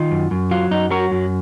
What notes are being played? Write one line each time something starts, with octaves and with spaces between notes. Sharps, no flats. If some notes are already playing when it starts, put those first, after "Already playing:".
Already playing: D#3 F4
F#2
F#2
F#3 F4
F#2 D#4
F#3 F#4 A#4
F#2